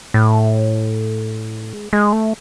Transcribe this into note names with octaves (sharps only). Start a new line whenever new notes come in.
A2
G#3
G#3
A3